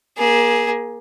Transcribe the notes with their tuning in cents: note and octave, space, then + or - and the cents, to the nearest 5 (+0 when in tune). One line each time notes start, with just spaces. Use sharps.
A#3 +25 G#4 +0